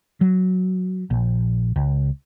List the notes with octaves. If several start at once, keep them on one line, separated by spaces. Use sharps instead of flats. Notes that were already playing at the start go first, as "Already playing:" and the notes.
F#3
A#1
C#2